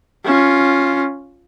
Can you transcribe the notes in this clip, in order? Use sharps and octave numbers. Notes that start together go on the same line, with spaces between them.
C#4 F4